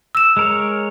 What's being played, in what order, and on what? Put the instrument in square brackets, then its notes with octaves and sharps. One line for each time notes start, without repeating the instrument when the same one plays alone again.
[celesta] E6 E7
[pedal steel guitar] G#3 A#4 C#5